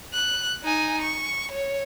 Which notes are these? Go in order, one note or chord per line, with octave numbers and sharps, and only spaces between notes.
F#6
D#4 G#5
C#6
C#5